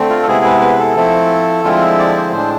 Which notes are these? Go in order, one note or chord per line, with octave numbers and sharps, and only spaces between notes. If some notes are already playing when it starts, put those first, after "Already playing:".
Already playing: D3 A3 C4
F4
A4
C3 G#3 B3 E4 G#4
B4
B4
A4
F3 A3 C4 E4
D3 F3 G#3 C4 E4 F4
E5
D5
C5
A2 G#3 D4 C5